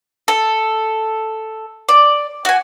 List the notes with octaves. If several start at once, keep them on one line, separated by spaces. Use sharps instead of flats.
A4
D5
F#4 G#5